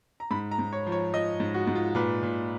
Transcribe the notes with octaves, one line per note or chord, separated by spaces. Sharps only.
A#5
G#2 B5
A#5
G#2
C#5
F3
C#5
F3 D#5
G#2
F#4
G#2
F4
A#2 B4
A#2